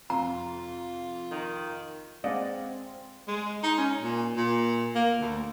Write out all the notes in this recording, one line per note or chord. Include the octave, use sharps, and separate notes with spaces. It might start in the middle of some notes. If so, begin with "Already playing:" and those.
F2 C3 F4 A#5
D#3
G#3 C4 D5 D#5 F5 F#5
G#3
D#4
C#4
A#2
A#2
A#3
D2